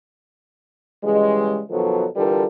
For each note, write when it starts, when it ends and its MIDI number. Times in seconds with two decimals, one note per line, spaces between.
1.03 1.60 49
1.03 1.60 52
1.03 1.60 55
1.03 1.60 56
1.70 2.05 47
1.70 2.05 51
1.70 2.05 53
1.70 2.05 54
1.70 2.05 69
2.15 2.45 50
2.15 2.45 52
2.15 2.45 55
2.15 2.45 65
2.15 2.45 69
2.15 2.45 70